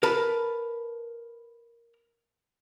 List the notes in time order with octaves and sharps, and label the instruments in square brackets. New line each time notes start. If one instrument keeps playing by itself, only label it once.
[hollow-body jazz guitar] A#4 B4 A5